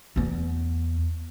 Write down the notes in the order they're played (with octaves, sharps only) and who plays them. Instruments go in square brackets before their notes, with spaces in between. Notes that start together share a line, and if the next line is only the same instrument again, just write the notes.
[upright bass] E2 B3